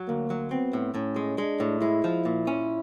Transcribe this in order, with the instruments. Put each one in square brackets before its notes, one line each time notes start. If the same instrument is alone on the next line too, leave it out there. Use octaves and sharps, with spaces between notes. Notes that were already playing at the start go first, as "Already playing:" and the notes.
Already playing: [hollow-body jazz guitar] F#3
[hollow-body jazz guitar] D2 [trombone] A#3
[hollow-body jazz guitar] F#3
[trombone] B3 [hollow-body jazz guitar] C4
[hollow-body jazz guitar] A2
[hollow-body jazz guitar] A2 [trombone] C#4
[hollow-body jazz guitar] G#3
[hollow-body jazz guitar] G#3 [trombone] D4
[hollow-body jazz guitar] A2
[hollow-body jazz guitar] G#3 [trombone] E4
[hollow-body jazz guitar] F3
A#2
C#4